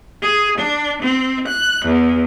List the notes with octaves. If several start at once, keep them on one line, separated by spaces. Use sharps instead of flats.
G#4
D4
C4
F#6
E2